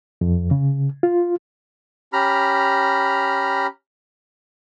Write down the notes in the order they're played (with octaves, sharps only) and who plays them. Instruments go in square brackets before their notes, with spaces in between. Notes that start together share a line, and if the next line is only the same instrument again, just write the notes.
[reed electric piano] F2
C#3
F4
[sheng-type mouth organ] C#4 G4 A#5 B5 F6